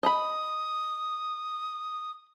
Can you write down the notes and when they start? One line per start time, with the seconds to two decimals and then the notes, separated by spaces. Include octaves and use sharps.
0.03 D#5 A#5 B5 D#6